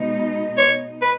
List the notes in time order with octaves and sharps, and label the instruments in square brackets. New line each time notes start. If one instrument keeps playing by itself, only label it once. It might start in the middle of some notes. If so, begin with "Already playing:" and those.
Already playing: [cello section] B2 G#3 D#4
[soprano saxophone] C#5
B4